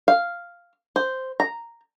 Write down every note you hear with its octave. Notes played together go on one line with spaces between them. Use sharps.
F5
C5
A#5